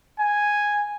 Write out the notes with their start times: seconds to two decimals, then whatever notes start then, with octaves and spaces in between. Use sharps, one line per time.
0.19 G#5